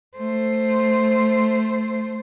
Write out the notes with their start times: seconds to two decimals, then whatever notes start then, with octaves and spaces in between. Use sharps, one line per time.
0.18 A3 C5